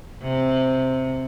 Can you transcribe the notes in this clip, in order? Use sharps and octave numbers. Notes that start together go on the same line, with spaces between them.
C3